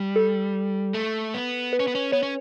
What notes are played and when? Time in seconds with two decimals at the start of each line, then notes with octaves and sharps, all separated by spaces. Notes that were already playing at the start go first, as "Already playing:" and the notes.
Already playing: G3
0.16 A4
0.94 A3
1.34 B3
1.73 B4
1.80 C#4
1.88 B3
1.95 C#4
2.12 B3 C#5
2.23 C#4